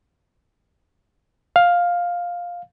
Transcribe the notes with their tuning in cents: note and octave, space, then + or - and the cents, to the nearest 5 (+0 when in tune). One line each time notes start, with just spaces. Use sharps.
F5 +10